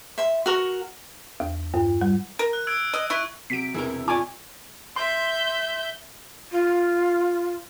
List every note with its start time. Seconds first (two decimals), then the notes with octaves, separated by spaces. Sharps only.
0.18 E5 C6
0.46 F#4 A#4 C#6
1.40 E2
1.74 G2
2.02 G3
2.39 A#4
2.53 F#6
2.67 E6 G#6 D7
2.93 D#5
3.10 E4 C#6 F#6
3.50 C3 F#3 B6 D7
3.74 E1 C3 E3 E4 A#4 E6
4.08 F4 D5 G#5 C#6
4.96 E5 C6 G6
6.52 F4